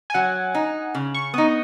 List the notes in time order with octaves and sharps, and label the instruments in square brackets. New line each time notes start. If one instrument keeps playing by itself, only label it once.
[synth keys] G#5
[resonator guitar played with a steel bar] F#3 [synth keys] F#5
[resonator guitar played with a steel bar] D#4
C#3
[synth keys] C#6
[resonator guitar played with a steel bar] B3 D#4 [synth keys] D#6